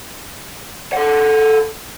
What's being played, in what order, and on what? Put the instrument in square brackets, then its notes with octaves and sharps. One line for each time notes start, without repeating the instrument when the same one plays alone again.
[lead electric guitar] A4 F#5